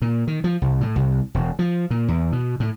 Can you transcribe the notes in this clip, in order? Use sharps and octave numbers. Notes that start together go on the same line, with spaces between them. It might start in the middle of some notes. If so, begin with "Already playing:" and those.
A#2
D#3
F3
C2
A2
C2
E1
F3
A#2
E2
B2
A2